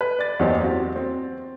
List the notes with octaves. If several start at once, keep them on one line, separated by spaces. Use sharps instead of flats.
B4
D5 A6
E2 F#3 A#3 D#4 G4 C5
C4 F#4
C4